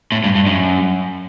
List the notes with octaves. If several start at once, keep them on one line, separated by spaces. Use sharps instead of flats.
A2
G2
G2
F#2